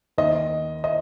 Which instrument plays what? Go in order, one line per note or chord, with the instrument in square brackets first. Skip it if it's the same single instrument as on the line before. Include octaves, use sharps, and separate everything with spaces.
[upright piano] D#2 D#3 D#5
D#5